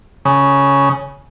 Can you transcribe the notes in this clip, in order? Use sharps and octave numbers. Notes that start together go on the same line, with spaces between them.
C#3